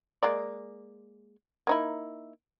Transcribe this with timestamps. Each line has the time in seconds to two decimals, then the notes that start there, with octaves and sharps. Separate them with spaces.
0.23 G#3 A#3 D5
1.67 A#3 D#4 E4